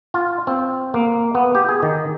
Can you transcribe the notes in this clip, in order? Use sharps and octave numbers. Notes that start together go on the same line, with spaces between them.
F4
C4
A#3
B3
G4
G#4
D#3